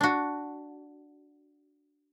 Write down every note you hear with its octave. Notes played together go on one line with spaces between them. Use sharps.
D4 F#4